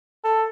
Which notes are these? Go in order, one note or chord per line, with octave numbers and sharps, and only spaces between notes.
A4